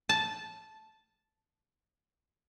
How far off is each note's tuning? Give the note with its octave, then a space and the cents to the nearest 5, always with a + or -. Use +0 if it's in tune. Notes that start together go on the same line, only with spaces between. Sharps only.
A5 -5